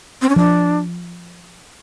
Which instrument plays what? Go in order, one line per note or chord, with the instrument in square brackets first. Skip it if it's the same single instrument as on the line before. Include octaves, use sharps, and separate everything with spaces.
[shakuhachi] C4
C#4
[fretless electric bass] F3 [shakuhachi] D4